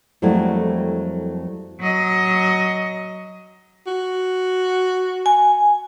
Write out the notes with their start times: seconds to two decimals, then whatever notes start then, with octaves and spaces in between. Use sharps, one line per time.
0.22 F2 F#3 G3 A3 A#3 E4
1.81 F#3 D#5
3.87 F#4
5.26 G#5